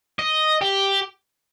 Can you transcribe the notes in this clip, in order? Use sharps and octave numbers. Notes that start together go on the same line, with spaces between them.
D#5
G4